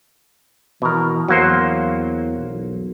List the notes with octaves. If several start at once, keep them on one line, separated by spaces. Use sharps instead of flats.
B2 E3 A#4
E2 F#3 A#3 C5
B1